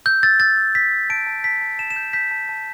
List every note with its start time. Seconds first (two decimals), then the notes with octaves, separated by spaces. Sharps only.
0.06 E6 G6
0.23 E6 A6
0.40 E6 A6
0.57 E6
0.75 E6 B6
0.92 E6
1.10 A5 D7
1.27 A5
1.44 A5 B6
1.61 A5
1.79 A5 E7
1.91 E7
1.96 G6
2.13 G6 B6
2.31 A5
2.49 A5